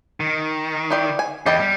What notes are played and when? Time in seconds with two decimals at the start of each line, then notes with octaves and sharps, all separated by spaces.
0.20 D#3
0.90 E4 G4 D5
1.19 G#5
1.46 E2 G4 D#5 B5
1.60 G3